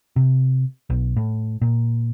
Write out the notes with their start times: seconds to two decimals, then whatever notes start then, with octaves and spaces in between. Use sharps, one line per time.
0.16 C3
0.90 B1
1.16 A2
1.62 A#2